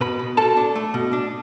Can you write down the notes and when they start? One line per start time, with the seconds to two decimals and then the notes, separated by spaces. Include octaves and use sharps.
0.01 B2 B4 B5
0.19 B2
0.37 B2 A4 A5
0.57 D4
0.76 A3
0.94 B2
1.13 D4